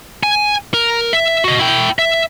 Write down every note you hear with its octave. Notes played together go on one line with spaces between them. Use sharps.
G#5
A#4
E5
F#4 D#5
E4 G5
E5